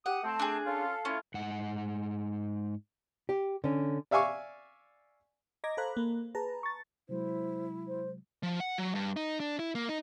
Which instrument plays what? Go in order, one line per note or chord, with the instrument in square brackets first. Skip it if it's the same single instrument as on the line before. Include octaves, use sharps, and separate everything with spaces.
[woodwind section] G4 D#6 [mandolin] F#5
[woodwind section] A3 C4 [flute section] A5
[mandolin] D4 G#4
[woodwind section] C#4 F4 [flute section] A4 F5
[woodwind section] A3 E4 F4 [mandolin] C#4
[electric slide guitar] G#2 F#5
[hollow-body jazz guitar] G4
D3 C#4
[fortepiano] D5 E5 F5 G#5 C#6 D6
[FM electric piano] D#5 A#5 D6 G#6 A#6
A4 C5 F5 A#5 B5 F#6
A#3
G#4 B4 A5 A#5
C#6 A6
[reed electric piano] C3 F#3 G#3 [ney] E4 [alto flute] C5
[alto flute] C5
[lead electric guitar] F3
F#5
F#3
G2
D#4
D4
E4
A#3
D#4